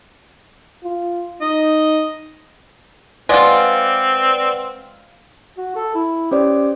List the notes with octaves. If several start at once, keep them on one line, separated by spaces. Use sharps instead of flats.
F4
D#4 D#5
G#3 C4 F4 B4 D5 F#5
F#4
A4
E4
C#4 G4 C5 D5